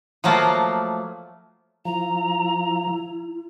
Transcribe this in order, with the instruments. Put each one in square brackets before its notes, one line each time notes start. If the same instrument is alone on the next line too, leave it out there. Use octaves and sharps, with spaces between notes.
[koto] F3 F#3 A3 A#3 F4
[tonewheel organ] F3 [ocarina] E4 [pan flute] A#5